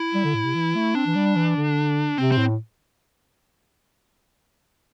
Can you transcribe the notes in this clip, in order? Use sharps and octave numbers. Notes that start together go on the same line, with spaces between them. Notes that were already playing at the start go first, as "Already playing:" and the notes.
Already playing: E4
G3
D3
A2
C3
E3
A3
C4 D4
E3
G3
E3
D3
C3 C4
C4
A2